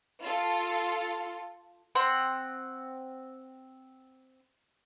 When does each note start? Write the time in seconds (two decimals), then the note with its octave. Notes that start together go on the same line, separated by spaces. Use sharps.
0.22 F4 A4
1.95 C4 F#5 C6